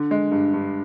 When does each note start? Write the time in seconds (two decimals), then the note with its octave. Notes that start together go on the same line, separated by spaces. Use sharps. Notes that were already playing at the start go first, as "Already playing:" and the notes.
Already playing: D3
0.11 G#3
0.32 G2
0.53 G2